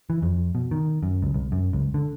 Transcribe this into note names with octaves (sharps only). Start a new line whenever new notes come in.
E3
F2
B2
D#3
F#2
C#2
C2
F#2
C#2
D3